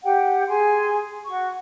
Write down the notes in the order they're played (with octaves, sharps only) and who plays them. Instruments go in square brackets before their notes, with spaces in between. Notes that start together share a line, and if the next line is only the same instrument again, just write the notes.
[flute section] G4 F#5 G5
G#4 G#5 C6
F#4 C#6